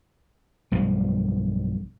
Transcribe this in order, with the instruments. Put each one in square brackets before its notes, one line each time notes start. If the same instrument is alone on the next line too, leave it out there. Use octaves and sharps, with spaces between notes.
[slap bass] B1 G2 F3